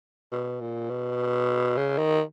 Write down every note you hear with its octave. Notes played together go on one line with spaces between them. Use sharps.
B2
A#2
B2
C#3
D#3